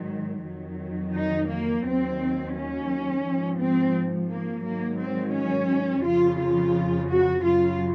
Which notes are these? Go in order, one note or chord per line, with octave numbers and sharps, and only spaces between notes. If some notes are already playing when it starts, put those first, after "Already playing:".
Already playing: G#2 D#3 F#3
F2 D#3 F#3
D#4
A#3
D#2 D#3 F#3 C4
C#4
G#2 F3
C4
A#3
G#2 D#3 F#3 A#3
C4
C#4
F2 C#3 F3 F4
F4
F#4
F#2 C#3 F#3 F4